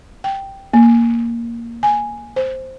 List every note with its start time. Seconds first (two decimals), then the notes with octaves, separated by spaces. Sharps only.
0.24 G5
0.73 A#3
1.83 G#5
2.36 C5